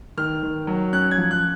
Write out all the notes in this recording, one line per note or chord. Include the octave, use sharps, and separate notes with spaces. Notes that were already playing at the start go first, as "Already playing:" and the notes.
D#3 F6
D#3
F#3
C#4 F#6
G#6
F3
F#6